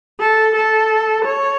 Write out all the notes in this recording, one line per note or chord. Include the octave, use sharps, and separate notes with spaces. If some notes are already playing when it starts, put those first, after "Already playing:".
A4
A4
C#5